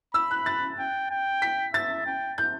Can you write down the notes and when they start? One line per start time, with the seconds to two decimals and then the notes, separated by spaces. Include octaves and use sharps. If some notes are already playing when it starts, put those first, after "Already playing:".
0.14 B5 E6
0.31 F#6
0.46 A6
0.79 G5
1.10 G5
1.42 B6
1.74 E5 A6
2.06 G5
2.38 G6